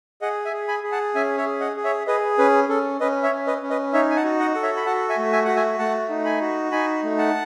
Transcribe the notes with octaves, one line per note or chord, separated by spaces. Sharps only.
G#4 D#5 F#5
E5 G#5
G#4
G#5 B5
G#4
F#5 A5
C#4 E5 G#5
C#5 E5
G#4
D#5 F#5
G#4
C#5 E5
G#4 B4 D#5
C#4 B4
C#4 A4
C#4 B4 D#5
C#5 E5
C#4
B4 D#5
C#4
B4 D#5
D#4 C#5 E5
G#5
F#5 A5
F#4
D#5 F#5
A4 F#5
C#5 E5
B5
F#4 F#5 A5
E5 G#5
A3
E5 G#5
F#4 F#5
E5 G#5
A3 F#5 A5
D#4
G#5 B5
F#4
D#4 G#5 B5
A3
F#5 A5